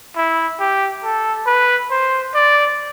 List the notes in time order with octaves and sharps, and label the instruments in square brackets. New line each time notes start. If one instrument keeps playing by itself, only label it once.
[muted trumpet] E4
G4
A4
B4
C5
D5